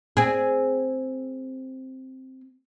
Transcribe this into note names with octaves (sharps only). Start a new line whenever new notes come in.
C4 G#4